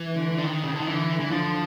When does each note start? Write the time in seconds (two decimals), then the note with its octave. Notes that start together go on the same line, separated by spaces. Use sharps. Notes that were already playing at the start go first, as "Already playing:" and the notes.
Already playing: E3
0.15 D3
0.38 D3
0.44 D#3
0.64 C#3
0.72 D3
0.80 D#3
0.87 D3 E3
1.20 E3
1.31 D3 F3